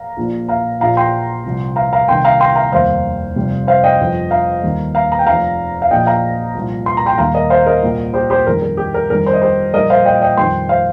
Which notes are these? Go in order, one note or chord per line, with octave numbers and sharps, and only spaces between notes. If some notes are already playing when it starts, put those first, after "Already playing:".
Already playing: F5 A#5
A#1 A#2 F3
F5 A#5
A#1 A#2 F3 F5 A#5
G5 C6
C2 C3 F3
F5 A#5
F5 A#5
C2 C3 D#3 G5 C6
F5 A#5
G5 C6
F5 A#5
F1 D#2 D#3 G3 C5 F5
F1 F2 C3 G3
C5 F5
D#5 G5
G1 F2 F3
F5 A#5
D#2 D#3 G3
F5 A#5
A#5
G5
F1 F2 F3 F5 A#5
F5
A#1 A#2 F3 D#5 G5
F5 A#5
C2 A#2 F3
C6
A#5
G5 C6
D#2 D#3 G3 F5 A#5
A#4 D#5
C5 F5
A#4 D#5
C2 A#2 G3
G4 C5
G4 C5
G1 F2 D#3 G3 A#4
A#4
G4
A#4
G1 F2 D#3 G3 A#4
C5
D#5
G4 C5
A#1 A#2 G3 A#4 D#5
C5 F5
D#5 G5
D#5 G5
F2 D#3 G3 G5 C6
C5 F5